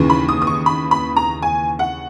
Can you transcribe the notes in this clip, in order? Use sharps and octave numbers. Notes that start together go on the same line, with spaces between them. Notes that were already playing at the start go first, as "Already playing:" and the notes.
Already playing: D#2 C#3 E3
B5
D#6
D#6
C#6
B5
B5
A#5
G#5
F#5